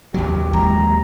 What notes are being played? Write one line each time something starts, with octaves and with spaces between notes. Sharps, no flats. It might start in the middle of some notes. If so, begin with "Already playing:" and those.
D#2 A#2 F#3 G4
E3 G#3 A#5